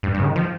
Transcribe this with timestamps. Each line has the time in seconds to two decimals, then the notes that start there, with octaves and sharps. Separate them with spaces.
0.03 G2
0.14 G2
0.20 C#3
0.25 D#3
0.36 F3